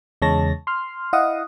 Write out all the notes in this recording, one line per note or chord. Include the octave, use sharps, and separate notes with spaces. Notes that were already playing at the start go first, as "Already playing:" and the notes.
E2 C#3 G#3 C#5 A5 A#6
C6 F6
E4 D#5 F5 F#5 D#6